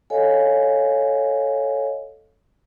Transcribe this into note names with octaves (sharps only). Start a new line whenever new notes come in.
A4 C#5 D#5 F5 G#5